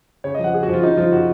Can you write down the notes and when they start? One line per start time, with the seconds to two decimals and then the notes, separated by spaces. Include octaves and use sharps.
0.24 C#3 C#5
0.35 D#5
0.39 F3 F#5
0.54 C#3 G#4
0.63 F#4
0.68 F3 F4
0.83 C#3 D#4
0.97 F3 F4
1.12 C#3 F#4